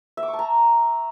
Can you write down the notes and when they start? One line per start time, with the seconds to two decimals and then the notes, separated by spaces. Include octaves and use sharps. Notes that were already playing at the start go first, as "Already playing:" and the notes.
0.17 E5
0.23 D6
0.28 C#6
0.33 A5
0.39 A#5